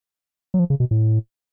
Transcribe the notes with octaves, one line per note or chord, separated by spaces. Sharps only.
F#3
F3
C#3
B2
A2